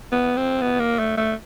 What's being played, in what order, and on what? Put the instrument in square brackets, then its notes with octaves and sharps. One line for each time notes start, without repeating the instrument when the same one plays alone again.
[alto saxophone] B3
C4
B3
A#3
A3
A3